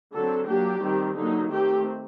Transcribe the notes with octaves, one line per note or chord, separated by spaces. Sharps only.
D3 F#3 C4 A4
F#3 A#3 D4 G4
D#3 G3 C4
D3 F#3 A#3 D#4
D#3 A3 C4 G4